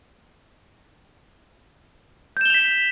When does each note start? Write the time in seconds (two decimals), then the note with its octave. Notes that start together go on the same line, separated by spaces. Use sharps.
2.37 G6
2.41 E7
2.45 G7
2.50 F7
2.54 B6